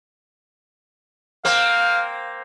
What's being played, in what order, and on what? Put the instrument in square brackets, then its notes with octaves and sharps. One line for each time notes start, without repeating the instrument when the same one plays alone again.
[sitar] A#3 C4 [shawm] F5